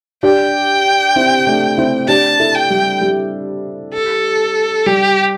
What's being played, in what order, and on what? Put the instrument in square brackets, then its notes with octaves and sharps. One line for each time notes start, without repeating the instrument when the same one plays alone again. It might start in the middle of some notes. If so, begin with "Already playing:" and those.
[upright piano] D4 G4 [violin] G5
[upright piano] C4 E4
A3 D4
C4 E4
[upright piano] D4 G4 [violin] A5
[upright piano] E4 A4
[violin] G5
[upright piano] G3
G3
[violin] A4
[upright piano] G3 [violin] G4